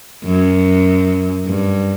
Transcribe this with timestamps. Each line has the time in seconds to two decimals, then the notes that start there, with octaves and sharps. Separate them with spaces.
0.24 F#2
1.46 G2